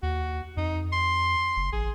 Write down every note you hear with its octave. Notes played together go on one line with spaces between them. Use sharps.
D#2 F#4
F2 D#4
C6
F#1
A1 G#4